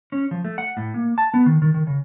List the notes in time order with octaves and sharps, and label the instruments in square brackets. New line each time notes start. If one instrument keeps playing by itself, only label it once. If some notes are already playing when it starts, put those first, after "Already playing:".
[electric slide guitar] C#4
F3
A3
F#5
A2
A#3
A5
B3
D#3
D#3
D#3
C#3